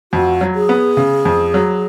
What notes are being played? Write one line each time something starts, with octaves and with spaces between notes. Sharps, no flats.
F2 F#4
F#3
G#4
B3
C#3
F2
F#3